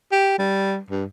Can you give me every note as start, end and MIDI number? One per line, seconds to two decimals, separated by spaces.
0.12 0.35 67
0.39 0.79 55
0.91 1.05 43